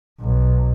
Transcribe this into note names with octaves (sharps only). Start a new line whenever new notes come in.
B1